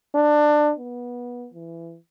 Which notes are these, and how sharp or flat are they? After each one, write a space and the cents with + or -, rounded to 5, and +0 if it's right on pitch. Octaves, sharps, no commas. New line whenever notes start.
D4 +20
B3 -20
E3 +20